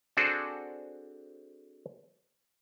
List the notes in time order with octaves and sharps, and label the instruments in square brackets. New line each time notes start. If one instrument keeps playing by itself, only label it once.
[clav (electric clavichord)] C4 D4 F#4 G#4 A4 C5